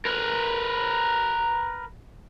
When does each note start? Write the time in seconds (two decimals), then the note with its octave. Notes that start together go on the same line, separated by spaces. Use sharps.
0.05 A#4 B4